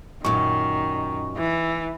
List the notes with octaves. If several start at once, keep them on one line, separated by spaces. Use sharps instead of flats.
F#2 A#2 D#3 C#6
E3